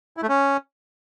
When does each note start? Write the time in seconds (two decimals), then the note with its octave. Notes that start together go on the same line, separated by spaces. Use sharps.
0.17 E4
0.23 A3
0.29 C#4